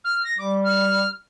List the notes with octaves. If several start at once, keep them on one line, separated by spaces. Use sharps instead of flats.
F6
A#6
G3 D6
F6